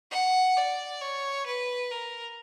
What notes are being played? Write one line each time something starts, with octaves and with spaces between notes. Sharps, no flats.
F#5
D5
C#5
B4
A#4